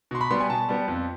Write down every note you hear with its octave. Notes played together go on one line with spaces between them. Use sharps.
B2 C6
B5
G3 B3 C6
G#5
B2 A5
G3 B3
F2